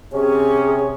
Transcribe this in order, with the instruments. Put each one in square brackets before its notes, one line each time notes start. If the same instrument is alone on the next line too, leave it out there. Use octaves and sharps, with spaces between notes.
[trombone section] C3 C#4 [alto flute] G#4 [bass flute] C#5